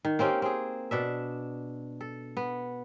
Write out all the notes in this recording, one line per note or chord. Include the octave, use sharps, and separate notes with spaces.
D#3
A#3 C4 C#4 G4
C4 G#4
B2 D4 E5
A4
B3